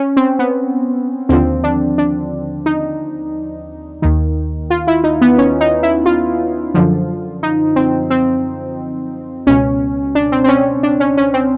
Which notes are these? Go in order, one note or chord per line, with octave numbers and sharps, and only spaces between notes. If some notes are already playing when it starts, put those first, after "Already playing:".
Already playing: C#4
C4
B3
D#2 D3 F3 C4
D4
D4
D#4
D#2 D#3
F4
E4
D#4
B3
C#4
D#4
E4
F4
F#2 D3 F3
D#4
C4
C4
C#2 B2 C#4
D4
C4
C4
C#4
D4
C#4
C#4
C4